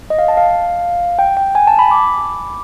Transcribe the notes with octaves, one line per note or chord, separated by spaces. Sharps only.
D#5
F5
A5
F5
G5
G5
G#5
A5
B5
D6